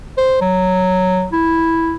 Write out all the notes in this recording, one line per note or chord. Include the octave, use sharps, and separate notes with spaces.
C5
F#3
E4